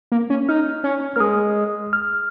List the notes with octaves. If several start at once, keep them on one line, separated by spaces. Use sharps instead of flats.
A#3
C#4
D#4 F6
C#4
A#3 F6
G#3 D#6
F6